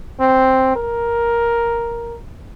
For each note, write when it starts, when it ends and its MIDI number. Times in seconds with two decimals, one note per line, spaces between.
0.20 0.71 60
0.76 2.17 70